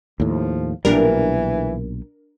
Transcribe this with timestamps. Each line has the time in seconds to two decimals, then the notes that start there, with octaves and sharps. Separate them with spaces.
0.20 D#2 A2 F3
0.85 B1 A#2 E3 G3 D4 A#4